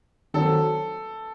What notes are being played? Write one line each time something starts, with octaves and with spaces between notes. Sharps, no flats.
D#3 F#3 C4 A4